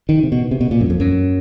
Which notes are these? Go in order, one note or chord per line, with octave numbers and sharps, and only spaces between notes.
D#3
C3
B2
C3
B2
A#2
F#2
F2
F#2